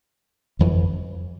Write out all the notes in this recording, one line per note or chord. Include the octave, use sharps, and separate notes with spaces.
G1 F2 E3